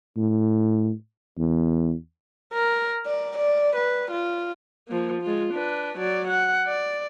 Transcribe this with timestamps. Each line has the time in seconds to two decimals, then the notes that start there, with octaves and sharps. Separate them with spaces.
0.17 A2
1.38 E2
2.53 A#4
3.06 D5
3.37 D5
3.76 B4
4.11 F4
4.88 F3 A#3
5.22 G#3 F4
5.53 D4 B4
5.98 F#3 D5
6.28 F#5
6.67 D5